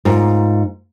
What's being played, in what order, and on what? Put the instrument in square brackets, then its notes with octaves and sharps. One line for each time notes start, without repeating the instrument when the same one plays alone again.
[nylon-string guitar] G#2 F4 A#4